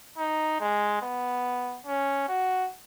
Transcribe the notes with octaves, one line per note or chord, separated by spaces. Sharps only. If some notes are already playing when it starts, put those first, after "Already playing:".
D#4
G#3
B3
C#4
F#4